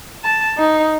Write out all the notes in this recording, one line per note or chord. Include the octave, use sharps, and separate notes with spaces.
A5
D#4